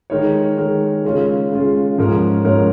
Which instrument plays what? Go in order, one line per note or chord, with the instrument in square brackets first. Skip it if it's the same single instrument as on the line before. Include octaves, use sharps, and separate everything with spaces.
[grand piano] D#3 G#3 D#4 A#4 C#5
D#3 G#3 D#4 A#4 C#5
C#3 G#3 C#4 F4
C#3 G#3 C#4 F4
G#2 F3 C#4 A#4 C#5
G#2 F3 C#4 A#4 C#5